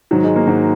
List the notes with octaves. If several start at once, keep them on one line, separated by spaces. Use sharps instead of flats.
G#2 D#3 F#3
G#3
A#3
G#2 D#3 F#4